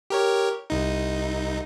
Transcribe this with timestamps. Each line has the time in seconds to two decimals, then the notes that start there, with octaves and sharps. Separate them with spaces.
0.10 G4 A#4 C#5
0.70 C2 D#4